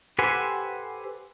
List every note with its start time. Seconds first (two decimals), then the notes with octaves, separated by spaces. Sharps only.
0.19 G4 A4 B4 C5 F#5 G#5